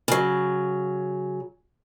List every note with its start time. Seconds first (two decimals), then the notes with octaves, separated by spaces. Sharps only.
0.08 C#3 F#3